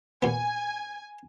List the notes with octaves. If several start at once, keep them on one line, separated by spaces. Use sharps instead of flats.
A#2 B3 G#5